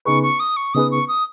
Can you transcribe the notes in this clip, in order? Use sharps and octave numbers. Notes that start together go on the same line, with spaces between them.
C#3 B3 D#4 G#4 B4 C#6
C#6
D#6
C#6
C#3 B3 D#4 G#4 B4 D#6
C#6
D#6